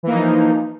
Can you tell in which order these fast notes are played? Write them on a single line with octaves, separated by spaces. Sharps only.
E3 A#3 D#4 F3